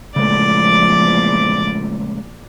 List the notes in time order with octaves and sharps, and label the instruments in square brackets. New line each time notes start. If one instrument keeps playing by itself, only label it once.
[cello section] E2 A#2 F3 [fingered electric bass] C#3 G#3 A3 [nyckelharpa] D5 D6